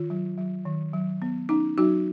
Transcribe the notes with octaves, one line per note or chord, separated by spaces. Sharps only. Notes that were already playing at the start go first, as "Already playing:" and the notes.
Already playing: D#3 F4
F#3
F#3
D#3
F#3
B3
C#4 D#4
F#3 D#4 F#4